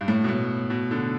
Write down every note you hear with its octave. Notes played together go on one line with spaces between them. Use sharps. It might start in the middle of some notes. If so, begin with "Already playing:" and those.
G2
A2
B2
A2
B2
D3